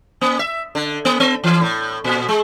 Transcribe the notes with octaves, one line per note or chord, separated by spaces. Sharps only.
A#3
E5
D3
A#3
B3
E3
A2
A#2
G#3